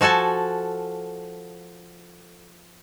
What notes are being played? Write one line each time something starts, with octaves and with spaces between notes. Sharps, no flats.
F3 F#4 A4 G#5 A5